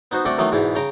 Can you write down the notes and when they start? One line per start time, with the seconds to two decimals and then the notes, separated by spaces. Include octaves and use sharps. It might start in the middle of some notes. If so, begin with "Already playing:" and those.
0.11 B3 D#4 F#4 C5
0.25 A3 C4 D4 F#4 D5 F#5
0.38 D#3 E3 F#3 A3 B3 C#4
0.52 E2 G#2 B2 E3 E4
0.75 C#3 G5 A#5